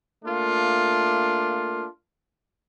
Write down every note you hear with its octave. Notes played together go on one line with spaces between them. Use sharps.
A3 A#3 D4 F4